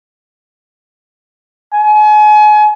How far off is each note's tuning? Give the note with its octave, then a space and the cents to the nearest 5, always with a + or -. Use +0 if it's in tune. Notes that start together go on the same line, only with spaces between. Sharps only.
G#5 +35